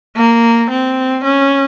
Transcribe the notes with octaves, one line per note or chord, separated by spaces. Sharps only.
A#3
C4
C#4